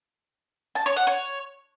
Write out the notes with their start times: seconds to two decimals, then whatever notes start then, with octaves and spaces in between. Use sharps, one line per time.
0.75 A5
0.86 C#5
0.96 F#5
1.07 C#5